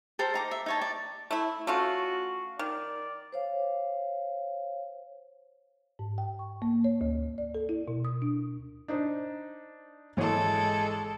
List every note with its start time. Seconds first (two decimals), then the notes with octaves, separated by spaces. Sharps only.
0.19 A4 A#4 C5 A#5
0.34 D#4 A#5 D6
0.51 E5
0.66 D#4 C#5 A5
0.81 D5
1.31 A3 E4
1.67 A3 C#4 F4 F#4
2.59 D#3 D5
3.33 C5 C#5 F5
5.99 G#2
6.18 G5
6.39 C#6
6.62 A#3
6.84 C#5
7.01 D2
7.38 D5
7.55 A4
7.69 E4
7.88 B2
8.05 D#6
8.22 D4
8.88 D4 D#4 C5
10.17 G#1 E3 G#3 A4 C#5